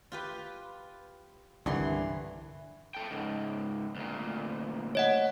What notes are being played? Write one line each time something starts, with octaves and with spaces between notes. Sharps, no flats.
F4 G4 B4
C2 G2 D3 E3 C6
A4 G5
C#2 G#2
D2 A#2
C#5 D#5 F#5